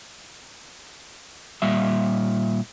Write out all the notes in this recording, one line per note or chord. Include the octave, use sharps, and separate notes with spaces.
A#2 G3 E5